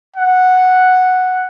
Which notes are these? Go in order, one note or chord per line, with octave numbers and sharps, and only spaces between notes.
F#5